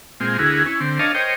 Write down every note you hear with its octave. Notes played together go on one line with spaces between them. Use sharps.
A#2 G#3 C4 F4
D2 E4 F#4 G#4 A#4
C#4 E4
D3 C4
D4 A#4 C#5 D#5 F5 A5
A#4 C5 C#5 D#5 G5